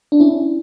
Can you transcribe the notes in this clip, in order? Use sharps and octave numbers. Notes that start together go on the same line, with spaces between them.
D4
C#4 E4